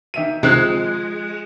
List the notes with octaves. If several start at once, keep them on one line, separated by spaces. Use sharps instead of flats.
D#3 E5 D#7
C3 D#3 F3 G#3 C4 F#6 C7